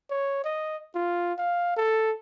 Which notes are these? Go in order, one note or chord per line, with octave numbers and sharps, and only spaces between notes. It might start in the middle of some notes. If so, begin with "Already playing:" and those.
C#5
D#5
F4
F5
A4